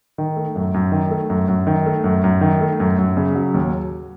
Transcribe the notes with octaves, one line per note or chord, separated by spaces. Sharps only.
D#3
A3
F#2
F#2
D#3
A3
F#2
F#2
D#3
A3
F#2
F#2
D#3
A3
F#2
F#2
C#3
F#3
D#2